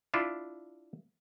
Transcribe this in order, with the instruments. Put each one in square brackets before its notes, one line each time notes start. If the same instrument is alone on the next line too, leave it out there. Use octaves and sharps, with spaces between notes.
[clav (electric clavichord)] D4 E4 F4